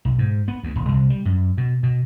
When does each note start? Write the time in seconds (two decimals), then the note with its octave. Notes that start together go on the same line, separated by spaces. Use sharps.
0.05 B1
0.19 G#2
0.48 B3
0.63 D2
0.76 D#1
0.89 C2
1.10 G3
1.25 F#2
1.58 B2
1.83 B2